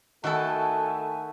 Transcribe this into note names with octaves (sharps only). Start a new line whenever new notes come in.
D#3 A3 E4 F#4 A4 E5 G#5 A5